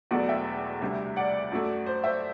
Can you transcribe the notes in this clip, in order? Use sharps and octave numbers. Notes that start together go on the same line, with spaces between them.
E1 E2 B2 F#3 A3 D5 F#5
E5 G5
D2 C3 G3
D5 F#5
F#2 F#3 A3
C5
C5 E5